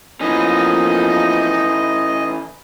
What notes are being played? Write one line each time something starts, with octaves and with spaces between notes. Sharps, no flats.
E3 F3 A#3 B3 C#4 D#4 D#5